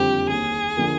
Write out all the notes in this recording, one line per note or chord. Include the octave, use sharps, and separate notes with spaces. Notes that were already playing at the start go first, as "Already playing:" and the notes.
Already playing: F#1 F2 D3 G3 C4 G4
D#2 G#4
D3 F3 A#3